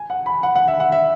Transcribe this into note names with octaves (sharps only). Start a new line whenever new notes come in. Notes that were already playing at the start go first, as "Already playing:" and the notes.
Already playing: G#5
F#5
B5
F#5
F#5
E5
F#5
E5